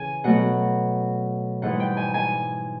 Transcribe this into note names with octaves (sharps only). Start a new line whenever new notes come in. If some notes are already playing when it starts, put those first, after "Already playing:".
Already playing: C#3 E3 G#5
B2 F#3 A3 F#5
G#2 E3 G3 F#5
G5
G#5
G#5